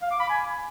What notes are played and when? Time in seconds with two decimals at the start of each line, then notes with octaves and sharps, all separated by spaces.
0.02 F5
0.11 D6
0.20 B5
0.29 G#5